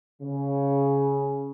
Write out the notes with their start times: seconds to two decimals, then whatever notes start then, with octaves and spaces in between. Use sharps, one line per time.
0.22 C#3